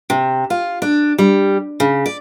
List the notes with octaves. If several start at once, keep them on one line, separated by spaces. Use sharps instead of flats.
C3
F4
D4
G3
C#3
D5